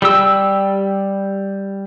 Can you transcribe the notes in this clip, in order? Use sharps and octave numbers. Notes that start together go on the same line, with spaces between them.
G3 G4 E6